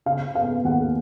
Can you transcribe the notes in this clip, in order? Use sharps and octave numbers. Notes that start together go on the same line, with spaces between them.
C#3 F5
B3 F5
D#2 F#5